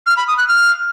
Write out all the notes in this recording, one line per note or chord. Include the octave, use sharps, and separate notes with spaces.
F6
B5
D#6
F#6
F6